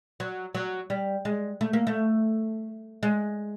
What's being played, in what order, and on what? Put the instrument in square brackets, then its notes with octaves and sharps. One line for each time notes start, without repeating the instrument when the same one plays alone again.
[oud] F#3
F#3
G3
G#3
A3
A#3
A3
G#3